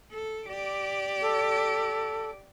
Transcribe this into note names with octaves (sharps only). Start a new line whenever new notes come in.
A4
G4 D5
A4